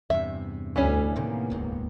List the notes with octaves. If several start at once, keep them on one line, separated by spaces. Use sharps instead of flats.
E2 G2 C3 E5
D2 E3 G3 C#4
A2 C3 D#3 A#3 B3
D#1 C#2 G#2